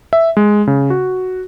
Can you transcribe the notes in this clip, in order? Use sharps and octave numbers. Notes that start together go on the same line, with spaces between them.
E5
G#3
C#3
F#4